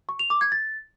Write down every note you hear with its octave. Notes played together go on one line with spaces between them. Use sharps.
C#6
F7
D6
G#6
A6